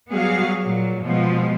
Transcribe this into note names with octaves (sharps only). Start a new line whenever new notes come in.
F#3 G3 B3 F#4 G#4 F5
A#2 F#3
B2 F3 G#3 B3